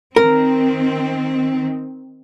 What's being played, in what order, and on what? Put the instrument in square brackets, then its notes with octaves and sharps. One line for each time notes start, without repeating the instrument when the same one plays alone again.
[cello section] D#3 C4 [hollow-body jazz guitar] A#4